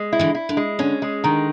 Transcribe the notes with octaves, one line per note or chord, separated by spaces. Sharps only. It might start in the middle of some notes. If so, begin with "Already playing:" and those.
Already playing: G#3
E4
D3 E3
E4
D3
G#3
D3 C#4
G#3
D3 D#3